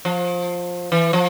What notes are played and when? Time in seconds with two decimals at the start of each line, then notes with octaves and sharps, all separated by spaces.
0.05 F3
0.92 E3
1.13 F3